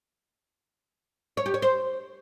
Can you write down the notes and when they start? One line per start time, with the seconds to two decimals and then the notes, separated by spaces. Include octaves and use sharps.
1.37 C#5
1.46 G4
1.54 C#5
1.62 C5